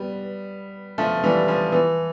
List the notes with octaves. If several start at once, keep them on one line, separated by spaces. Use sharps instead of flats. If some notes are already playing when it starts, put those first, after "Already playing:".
Already playing: G3 B3
F3 A3
E3 G3
F3
E3